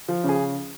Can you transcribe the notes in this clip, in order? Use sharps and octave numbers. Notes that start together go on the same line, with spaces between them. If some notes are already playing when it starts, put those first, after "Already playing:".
F3
C#3 G#4